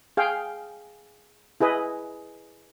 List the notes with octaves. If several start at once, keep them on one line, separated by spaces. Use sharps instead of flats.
G#4 F5 G5
E4 G#4 B4 D#5